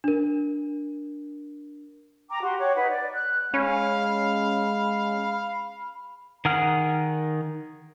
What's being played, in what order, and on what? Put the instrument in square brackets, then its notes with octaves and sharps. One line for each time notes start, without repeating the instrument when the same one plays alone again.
[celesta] D4 A#4
[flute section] G5 A#5 D6
F#4 G4 C6
C#5 F#5 G5 D6
D#4 B4 F#5
D5
F#6
[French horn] G#3 [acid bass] C#4 [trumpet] F5 [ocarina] B5
[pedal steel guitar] D#3 G#4 F#5 F6